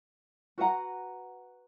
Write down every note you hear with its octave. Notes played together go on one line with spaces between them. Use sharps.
F#4 B4 F#5 A#5